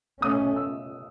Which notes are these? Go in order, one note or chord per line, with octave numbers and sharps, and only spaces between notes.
B2 A3 C#4 D#6
E6